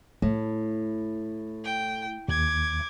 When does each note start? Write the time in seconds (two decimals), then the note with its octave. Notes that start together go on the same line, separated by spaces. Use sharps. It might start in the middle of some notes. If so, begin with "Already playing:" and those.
0.22 A2 A3
1.65 G5
2.28 D#2 D6 G#6